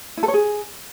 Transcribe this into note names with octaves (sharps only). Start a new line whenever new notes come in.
E4
A4
C#5
G#4